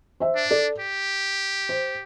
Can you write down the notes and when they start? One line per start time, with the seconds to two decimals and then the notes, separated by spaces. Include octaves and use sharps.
0.20 C5 E5
0.36 D4
0.51 A4 D5
0.80 G4
1.69 C5